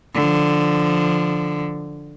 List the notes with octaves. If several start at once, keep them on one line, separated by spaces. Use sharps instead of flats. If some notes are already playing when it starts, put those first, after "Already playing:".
D3 F3